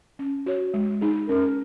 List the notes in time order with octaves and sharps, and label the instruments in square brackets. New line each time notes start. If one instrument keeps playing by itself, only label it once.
[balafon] C#4
F#4 C#5
G#3
D#4 G#4
[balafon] C#4 [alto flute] A#4